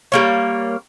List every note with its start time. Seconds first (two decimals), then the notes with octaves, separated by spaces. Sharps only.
0.12 G3 A#3 C#5